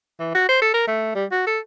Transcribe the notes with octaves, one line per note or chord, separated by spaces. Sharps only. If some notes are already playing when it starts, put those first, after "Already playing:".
E3
F#4
C5
A4
A#4
A3
G3
F#4
A4